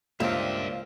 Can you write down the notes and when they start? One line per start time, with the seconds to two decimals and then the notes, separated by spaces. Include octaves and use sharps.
0.20 C#2 G2 A#2 C4 D5 E5 F5